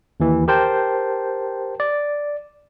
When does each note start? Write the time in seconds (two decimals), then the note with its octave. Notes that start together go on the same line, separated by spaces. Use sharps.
0.20 D#2 E3
0.48 G4 A#4 C5 G5 A5
1.80 D5